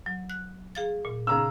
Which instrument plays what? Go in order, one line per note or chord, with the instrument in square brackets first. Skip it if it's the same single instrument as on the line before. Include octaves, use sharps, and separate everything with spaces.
[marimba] F#3
F#6
G#4 F5 A6
A#2
[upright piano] C#3 A#5 E6